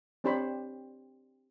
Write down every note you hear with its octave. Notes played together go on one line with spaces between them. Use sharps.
C4 D4 G4 C5 C#5 B5